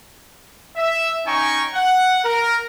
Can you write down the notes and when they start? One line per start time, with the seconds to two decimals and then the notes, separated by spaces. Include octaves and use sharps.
0.76 E5
1.26 C#4 D#4 G5 G#5 A#5 C#6
1.74 F#5
2.24 A#4